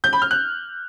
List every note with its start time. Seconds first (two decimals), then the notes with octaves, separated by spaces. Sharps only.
0.04 G6
0.13 B5
0.22 F6
0.31 F#6